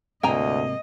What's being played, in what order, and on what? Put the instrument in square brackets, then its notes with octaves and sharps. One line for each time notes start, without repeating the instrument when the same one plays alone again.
[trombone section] D2 [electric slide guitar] G#2 C3 A#3 [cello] D#5 [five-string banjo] G5 G#5 A#5